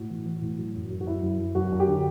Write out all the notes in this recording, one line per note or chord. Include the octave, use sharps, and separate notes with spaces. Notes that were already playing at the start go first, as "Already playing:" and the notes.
Already playing: A2 F#4
E3
E3
A2
F#3
F#2
F#2
F#4
F#3 E4
F#2
F#3
F#2 F#4
F#2
G4
D3